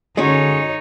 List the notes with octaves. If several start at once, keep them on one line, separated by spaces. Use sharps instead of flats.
D3 G#3 C#4 D#4 F#4 C#5